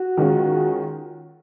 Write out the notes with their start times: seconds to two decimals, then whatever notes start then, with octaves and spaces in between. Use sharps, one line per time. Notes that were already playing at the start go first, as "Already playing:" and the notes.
Already playing: F#4
0.17 D#3 G#3 C#4 F4